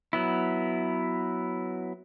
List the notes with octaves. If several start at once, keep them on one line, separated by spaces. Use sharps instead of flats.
F#3 B3 E4